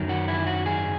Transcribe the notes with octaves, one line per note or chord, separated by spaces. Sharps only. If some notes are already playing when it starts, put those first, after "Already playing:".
Already playing: F#2 D#3 F#3
F#4
E4
F#4
G#4